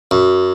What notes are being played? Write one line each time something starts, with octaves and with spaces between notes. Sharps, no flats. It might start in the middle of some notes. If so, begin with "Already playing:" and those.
F#2